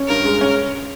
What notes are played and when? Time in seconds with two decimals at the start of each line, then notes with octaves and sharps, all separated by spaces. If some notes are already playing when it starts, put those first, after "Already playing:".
Already playing: C#4
0.08 G2 A#4
0.25 G#3
0.41 C#4